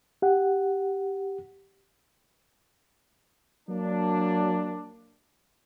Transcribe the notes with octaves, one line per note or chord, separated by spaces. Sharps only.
G4 F#5
F#3 A#3 D4